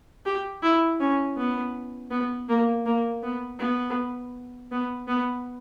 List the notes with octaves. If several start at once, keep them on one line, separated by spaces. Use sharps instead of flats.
G4
E4
C#4
B3
B3
A#3
A#3
B3
B3
B3
B3